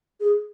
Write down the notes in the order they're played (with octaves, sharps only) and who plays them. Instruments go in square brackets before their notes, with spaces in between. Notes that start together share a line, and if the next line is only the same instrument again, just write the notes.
[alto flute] G#4